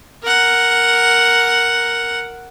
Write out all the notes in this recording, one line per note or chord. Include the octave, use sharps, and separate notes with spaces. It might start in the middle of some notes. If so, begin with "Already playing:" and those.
A#4 F#5